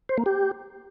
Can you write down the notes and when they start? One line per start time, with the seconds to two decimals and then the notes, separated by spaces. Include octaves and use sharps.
0.09 C5
0.18 A#3
0.26 G4